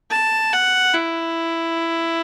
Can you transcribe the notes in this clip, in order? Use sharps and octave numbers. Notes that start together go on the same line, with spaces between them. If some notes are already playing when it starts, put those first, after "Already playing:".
A5
F#5
E4